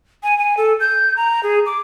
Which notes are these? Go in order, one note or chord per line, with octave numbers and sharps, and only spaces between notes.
G#5
G#5
A4
G6
A#5
G#4
D6